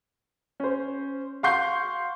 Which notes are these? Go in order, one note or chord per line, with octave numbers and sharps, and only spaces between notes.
C#4 C5
F5 F#5 C6 C#6 G6 C7